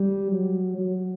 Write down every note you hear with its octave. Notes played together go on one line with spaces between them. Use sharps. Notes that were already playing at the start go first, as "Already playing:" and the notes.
Already playing: G3
F#3
F#3